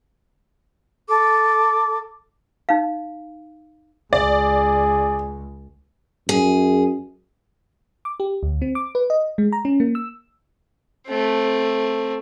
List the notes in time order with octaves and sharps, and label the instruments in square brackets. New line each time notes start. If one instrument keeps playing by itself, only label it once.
[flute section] A4 D6
[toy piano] D#4 F5
[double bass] C#2 [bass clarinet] G#4 [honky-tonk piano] D5
[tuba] F#2 [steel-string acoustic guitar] G#4
[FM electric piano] D6
G4
D2
C4
D6
B4
D#5
G#3
A#5
C#4
A#3
E6
[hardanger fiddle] A3 C4